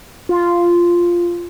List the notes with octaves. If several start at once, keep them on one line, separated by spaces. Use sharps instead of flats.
F4